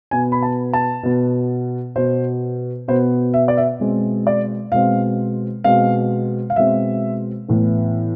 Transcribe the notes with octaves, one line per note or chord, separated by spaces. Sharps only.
B2 B3 G#5
B5
A5
A5
B2 B3
B2 B3 C5
B2 B3 C5
E5
D5
E5
B2 G#3 C4
D5
B2 G#3 C4 F5
B2 G#3 C4 F5
F5
B2 G#3 C4 E5
A2 E3 B3